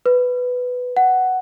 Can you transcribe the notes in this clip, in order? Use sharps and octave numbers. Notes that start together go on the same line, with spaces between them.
B4
F#5